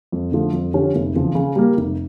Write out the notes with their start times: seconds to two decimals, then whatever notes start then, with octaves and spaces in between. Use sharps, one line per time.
0.12 F2
0.32 D3 F3 A3
0.53 F2
0.74 D3 F3 C#4 G4
0.95 F1
1.15 E2 C#3 F3
1.35 C#3
1.56 G3 A#3
1.77 F1